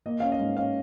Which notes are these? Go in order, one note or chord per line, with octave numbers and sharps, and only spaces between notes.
A#3 D#5
C#4 F5
D#5
G#2
C#4 F5